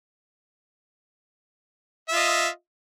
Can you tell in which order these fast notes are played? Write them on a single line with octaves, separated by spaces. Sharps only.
E5 F4 D#5